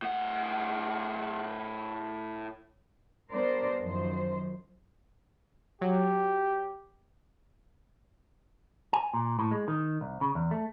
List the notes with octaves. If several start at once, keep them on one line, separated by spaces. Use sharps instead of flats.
A2 F#5
G3 B3 D4 A#4 C5 D5
F#2 D#3 F3 C5
F#3 G4
G#5
A#2
A2
G#3
D#3
C2
C#3
E2
A3